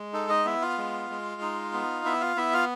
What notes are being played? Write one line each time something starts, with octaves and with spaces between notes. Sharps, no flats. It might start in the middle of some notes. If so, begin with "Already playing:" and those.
Already playing: G#3
D#4 A4
D#4 D#5
B3 E4 E5
F4 F5
G#3
G#3
D#4
B3
B3 E4 E5
F4 F5
B3 E4 E5
F4 F5